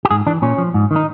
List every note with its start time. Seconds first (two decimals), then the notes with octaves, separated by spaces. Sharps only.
0.05 G4
0.11 G#2 G#4
0.27 E3 D4
0.42 A#2 C#4
0.58 F3
0.74 G#2
0.91 D#3
0.96 D#4